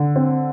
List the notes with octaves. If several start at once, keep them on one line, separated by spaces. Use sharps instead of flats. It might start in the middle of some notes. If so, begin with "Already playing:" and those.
Already playing: D3
C4